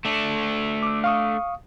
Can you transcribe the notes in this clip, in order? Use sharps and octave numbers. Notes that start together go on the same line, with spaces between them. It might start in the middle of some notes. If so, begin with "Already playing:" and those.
A3 D4
D6 E6
F5 C#6 D#6